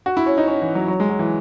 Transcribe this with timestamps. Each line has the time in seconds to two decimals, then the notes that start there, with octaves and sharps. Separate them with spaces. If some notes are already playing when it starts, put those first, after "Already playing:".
0.06 F#4
0.17 E4
0.26 C#4
0.38 D#4
0.47 C#4
0.62 E3
0.75 F#3
0.88 F#3
1.00 G#3
1.09 F#3
1.19 E3